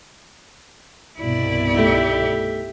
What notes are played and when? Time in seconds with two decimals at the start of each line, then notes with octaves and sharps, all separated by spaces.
1.18 C2 G2 B2 E4 D5
1.74 A3 D#4 G4 E5